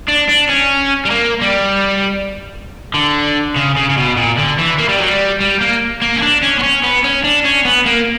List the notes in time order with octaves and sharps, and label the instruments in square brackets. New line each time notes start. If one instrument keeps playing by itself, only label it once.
[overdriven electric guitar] D4
D4
C#4
G3
A#3
G3
D3
C#3
C#3
C#3
B2
A#2
D3
E3
A#3
G3
F#3
G3
G3
A#3
A#3
C#4
D4
C#4
B3
C#4
B3
C#4
D4
C#4
B3
A#3